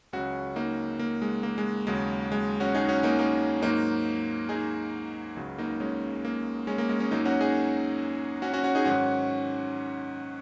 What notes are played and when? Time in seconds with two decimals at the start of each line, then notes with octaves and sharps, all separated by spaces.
0.13 C#2 C#3 F#3 C#4 F#4
0.56 A#3 D#4
0.99 A#3
1.22 G#3
1.43 A#3
1.58 G#3
1.87 D#2 C#3 F#3 G#3
2.32 G#3
2.60 C#4 F#4
2.75 D#4 G#4
2.89 C#4 F#4
3.03 A#3 D#4
3.19 A#3 D#4
3.62 G#2 F#3 A#3 D#4
4.49 D#4 G#4
5.36 C#2 C#3 F#3
5.58 A#3 D#4
5.80 G#3 C#4
6.25 A#3
6.67 G#3 C#4
6.78 A#3
6.89 G#3 C#4
7.00 G#3 C#4
7.11 F#2 F#3 A#3 D#4
7.25 C#4 F#4
7.41 D#4 G#4
8.42 C#4 F#4
8.54 C#4 F#4
8.64 C#4 F#4
8.75 D#4 G#4
8.85 G#2 D#3 F#3 C#4 F#4